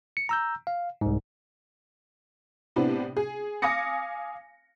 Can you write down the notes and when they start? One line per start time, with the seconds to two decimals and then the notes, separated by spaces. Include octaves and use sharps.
0.17 C#7
0.29 A#5 E6 G6
0.67 F5
1.01 C2 G#2
2.76 A2 C3 B3 C4 D4
3.17 G#4
3.62 F5 G#5 D6 D#6 A#6 C#7